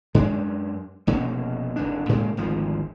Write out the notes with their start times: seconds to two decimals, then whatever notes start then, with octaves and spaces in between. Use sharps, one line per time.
0.14 F#2 G#3 D4
1.07 F1 B2 A#3 C#4
1.76 F1 E2 D4
2.09 A2 C#3 G#3 A#3
2.37 G#1 D2 F3